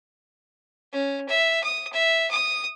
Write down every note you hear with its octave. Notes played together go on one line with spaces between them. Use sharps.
C#4
E5
D#6
E5
D#6